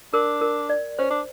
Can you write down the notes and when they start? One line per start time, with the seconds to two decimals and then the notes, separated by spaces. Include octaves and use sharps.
0.13 D4 A#4
0.41 A#4
0.69 D5
0.99 C#4 C5
1.10 D4